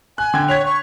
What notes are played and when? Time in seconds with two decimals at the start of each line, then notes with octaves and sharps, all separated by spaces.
0.18 G#5 F#6
0.34 D3 G5 G#6
0.48 C#5 G#6 B6 F7
0.66 C#6